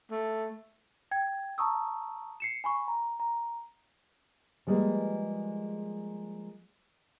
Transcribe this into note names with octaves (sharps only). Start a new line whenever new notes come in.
A3
G5 G#6
A5 A#5 C#6 D#6 E6
C7 C#7 E7
G#5 B5 C#6
A#5
A#5
F3 G3 G#3 A#3 G#4 B4